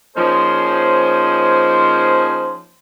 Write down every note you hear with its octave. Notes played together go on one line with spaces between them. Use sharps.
F3 A#3 C#4 D#4 G#4 C5